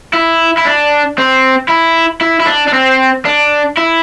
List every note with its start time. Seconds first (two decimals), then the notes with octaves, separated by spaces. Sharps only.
0.13 E4
0.57 E4
0.65 D4
1.18 C4
1.69 E4
2.21 E4
2.40 E4
2.47 D4
2.67 D4
2.73 C4
3.25 D4
3.77 E4